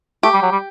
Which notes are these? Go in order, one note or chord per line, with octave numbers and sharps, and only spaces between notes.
A3 G4
G3
F#3
G3